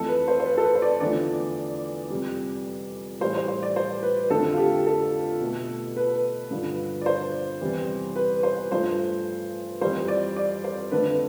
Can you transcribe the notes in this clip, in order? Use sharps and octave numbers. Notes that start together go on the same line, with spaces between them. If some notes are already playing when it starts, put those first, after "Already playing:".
Already playing: F2 E3 A3 A4
B4
C5
C5
B4
A4
B4
C5
D5
E2 D3 F3 A3 D5
F2 C3 G3
A2 E3 G3 C5
C5
C5
D5
C5
B4
F2 D3 F3 A3 A4
F4
G4
A4
B2 A3
B4
G2 D3 F3
D5
C5
E2 C3 E3 G3
B4
C5
G2 F3 A3 C5
F2 E3 G3 C5
D5
D5
C5
F2 D3 A3 B4